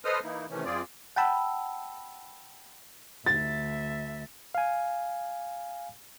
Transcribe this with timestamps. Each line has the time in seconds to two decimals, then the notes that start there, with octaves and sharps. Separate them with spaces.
0.05 A4 B4 C5 D#5 D#6 F6
0.24 E3 A#3 D#4 E4
0.50 C3 D#3 E3 A3 C#4
0.65 F#2 C4 F4 G#4 D5
1.16 F#5 G5 A5 B5 E6
3.26 D2 E5 A6
4.55 F5 G#5